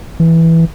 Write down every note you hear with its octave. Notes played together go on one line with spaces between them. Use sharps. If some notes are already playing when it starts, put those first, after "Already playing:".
E3